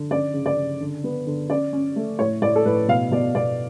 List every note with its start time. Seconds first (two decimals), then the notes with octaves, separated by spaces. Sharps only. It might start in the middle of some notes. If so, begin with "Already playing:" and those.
Already playing: D3
0.11 C#4 D5
0.34 C#3
0.46 D5
0.57 C#3
0.80 D3
1.04 B3
1.27 D3
1.50 C#4 D5
1.73 C#4
1.96 A3
2.19 A2 C#5
2.42 A2 D5
2.56 A4
2.65 A2 B4
2.88 B2 F5
3.11 B2 D5
3.35 B2 D5